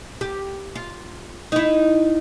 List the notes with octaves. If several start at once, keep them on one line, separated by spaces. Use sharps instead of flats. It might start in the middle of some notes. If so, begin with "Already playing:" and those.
G4
F4
D#4 E4